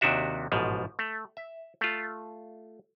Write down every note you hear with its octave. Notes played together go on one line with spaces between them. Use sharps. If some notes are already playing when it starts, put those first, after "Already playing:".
D#2 C3 D#3 D4 F#4 E5
A1 G#2 B2 F3
A3
E5
A3 F4